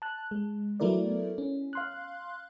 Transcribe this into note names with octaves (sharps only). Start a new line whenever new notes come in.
A5 F#6
G#3
F#3 A3 B3 E4 A#4 D5
C#4
F5 C6 F#6